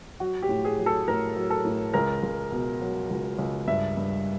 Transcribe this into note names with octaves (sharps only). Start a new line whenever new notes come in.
F#3 F#4
G4
A2
G#4
F#3
A4
A2 A#4
F#3
A4
A2
C#2 A#4
C#2
B2
F#3
C#2
C#2
G2 E5
G2